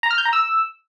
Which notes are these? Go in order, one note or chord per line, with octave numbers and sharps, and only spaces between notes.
A#5
F6
G6
A#5
E6